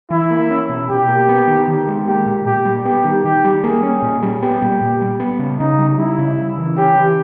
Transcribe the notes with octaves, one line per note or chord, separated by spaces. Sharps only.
E3 E4
A#3
C#4
B2
B2 G4
A#3
B3
D#3
D#3
G#3
A#3 G4
A#2
A#2 G4
G3
B3 G4
D#3
D#3 G4
G3
A#3 G#4
C#4
A#2
G3
B3 G4
A#2
A#2
G3
B3
C#3
C#3 D#4
G3
G3 E4
C#3
C#3
E3
C#4 G4
E3